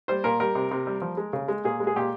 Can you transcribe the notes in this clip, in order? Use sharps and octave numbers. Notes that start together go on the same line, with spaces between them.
G3 C5
A#2 A#4
G3 A#4
C3
C3
G3
F3
G#3
C#3
G#3
A#2 G#4
G#3
G#4
A#2 G4